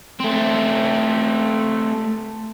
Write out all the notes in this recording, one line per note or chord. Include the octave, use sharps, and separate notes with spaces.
A3 C4